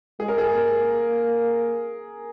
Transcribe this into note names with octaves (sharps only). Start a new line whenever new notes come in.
G#3 G#4
A#4
G#4
A#3